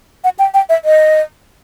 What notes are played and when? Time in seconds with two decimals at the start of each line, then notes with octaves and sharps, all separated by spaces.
0.24 F#5
0.39 G5
0.54 G5
0.69 E5
0.85 D#5